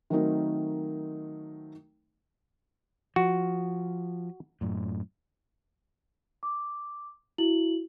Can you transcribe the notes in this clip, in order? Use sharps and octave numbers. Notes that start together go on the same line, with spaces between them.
D#3 F#3 A3 C4 D#4 A#4
F3 F#4
F#2 A2
D6
E4 F#4 F#7